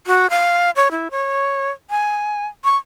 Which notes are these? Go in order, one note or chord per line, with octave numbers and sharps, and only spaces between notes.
F#4
F5
C#5
E4
C#5
G#5
C#6